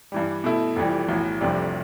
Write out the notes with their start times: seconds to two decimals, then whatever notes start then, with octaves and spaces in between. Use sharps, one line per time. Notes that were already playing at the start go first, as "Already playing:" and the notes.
0.12 G2 E3 G3
0.44 B2 A3 E4
0.76 F1 F2 E3 G3
1.09 B1 A2 E3
1.41 F1 F2 C3 G3 D4